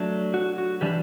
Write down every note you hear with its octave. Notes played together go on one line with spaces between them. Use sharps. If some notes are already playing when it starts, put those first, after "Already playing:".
Already playing: F#3 A3 D4
F#4
F#4
E3 G3 D4 G4